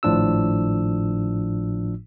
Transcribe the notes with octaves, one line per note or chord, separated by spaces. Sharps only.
G#1 A2 F3 D4 F4 E6